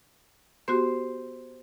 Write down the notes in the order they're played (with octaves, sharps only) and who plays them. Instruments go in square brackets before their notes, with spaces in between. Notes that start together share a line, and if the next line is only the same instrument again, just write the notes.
[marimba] B3 F#4 G4 [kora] C5